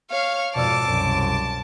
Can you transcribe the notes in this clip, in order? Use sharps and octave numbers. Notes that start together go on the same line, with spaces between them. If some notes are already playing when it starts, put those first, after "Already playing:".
C#5 F5 F6
F2 G#2 B2 D5 A5 D6 E6
C2 F#2